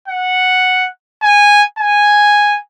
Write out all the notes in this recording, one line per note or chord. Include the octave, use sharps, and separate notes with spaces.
F#5
G#5
G#5